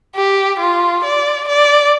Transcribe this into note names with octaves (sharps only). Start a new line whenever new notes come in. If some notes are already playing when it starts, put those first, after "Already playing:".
G4
F4
D5
D5